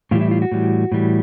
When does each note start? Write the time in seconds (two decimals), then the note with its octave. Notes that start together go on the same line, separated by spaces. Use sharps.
0.11 A2 E3 G3 F4
0.21 E4
0.31 F4
0.42 F#4
0.52 A2 E3 G3
0.92 A2 E3 G3